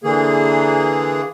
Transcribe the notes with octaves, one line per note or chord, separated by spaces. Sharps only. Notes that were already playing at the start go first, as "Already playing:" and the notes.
D3 E3 A#3 G#4